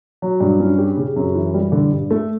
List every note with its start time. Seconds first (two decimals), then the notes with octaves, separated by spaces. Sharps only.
0.22 F#3
0.40 G2
0.60 C#4
0.78 G4
0.97 C#3
1.16 F#2
1.35 E3
1.54 G3
1.72 D3
1.91 G2
2.11 A3